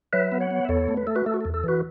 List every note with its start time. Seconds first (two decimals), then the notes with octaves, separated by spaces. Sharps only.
0.13 F#3 B4 E5
0.32 B3
0.40 C#5 F#5
0.51 B3
0.65 E5
0.69 E2 A4 C#5
0.89 A3
0.97 B4
1.07 A3 A4
1.15 F#4 B4
1.26 A3 A4
1.34 F#4
1.41 E2 A4
1.54 A4
1.64 E3 F#4 B4